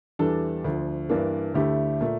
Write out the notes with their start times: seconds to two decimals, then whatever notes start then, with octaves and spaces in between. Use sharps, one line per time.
0.19 E2 E3 G3 D4 A4
0.64 D2 D3 F3
1.09 G2 E3 A#3 D4
1.54 D2 D3 A3 E4 G4
2.01 A#2 A3